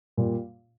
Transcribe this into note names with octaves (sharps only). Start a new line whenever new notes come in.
A#2 G3 A#3